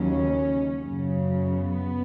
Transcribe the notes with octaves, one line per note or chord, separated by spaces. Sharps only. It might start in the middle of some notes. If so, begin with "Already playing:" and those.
Already playing: D#2 C#3 F#3 C#4
F#2 C#3 F#3
B3